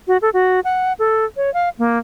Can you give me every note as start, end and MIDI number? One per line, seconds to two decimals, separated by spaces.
0.08 0.17 66
0.22 0.30 69
0.33 0.60 66
0.64 0.93 78
0.99 1.25 69
1.37 1.52 73
1.54 1.69 77
1.79 1.98 58